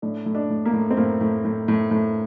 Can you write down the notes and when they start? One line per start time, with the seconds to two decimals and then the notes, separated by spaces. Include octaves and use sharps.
0.02 A2 D4
0.26 A2
0.35 D4
0.50 A2
0.65 A#3
0.73 A2
0.91 C4
0.97 A2 A#3
1.21 A2
1.45 A2
1.68 A2
1.91 A2